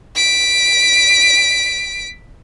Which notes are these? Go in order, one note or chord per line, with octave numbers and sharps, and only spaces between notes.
B6 D7